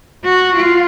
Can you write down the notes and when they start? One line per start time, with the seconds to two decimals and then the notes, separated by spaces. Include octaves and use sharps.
0.25 F#4
0.56 F4